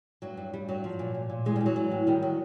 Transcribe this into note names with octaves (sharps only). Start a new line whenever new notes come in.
G2 F#3
G2
G2 G3
G2 F#3
F3
A#2
A#2
A#2
E3 G#3
G3
E3
F#3
E3
A2
D#3 G3
F#3